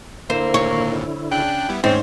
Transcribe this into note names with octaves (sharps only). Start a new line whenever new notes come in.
D3 A#3 E4 C5
G#1 D#2 A#2 C#5
C#3 D4 G5 F#6
G3 B3 E4
D#2 G#2 C4 C#4 C5 C#5